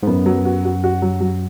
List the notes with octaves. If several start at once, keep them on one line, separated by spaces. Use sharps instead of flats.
G#2
F#2 B3
F#3
F#4
F#4
F#4
F#3
F#3